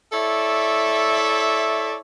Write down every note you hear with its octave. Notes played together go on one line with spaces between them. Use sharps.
E4 A4 C#5 D5 E5